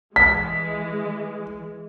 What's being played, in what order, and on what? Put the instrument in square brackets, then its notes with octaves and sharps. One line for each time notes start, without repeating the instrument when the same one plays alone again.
[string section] E3 G#3 [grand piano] B6